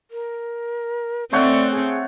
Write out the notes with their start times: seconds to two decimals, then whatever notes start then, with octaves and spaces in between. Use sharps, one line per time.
0.11 A#4
1.33 A3 C4 C#5 D5 F#5
1.71 G#4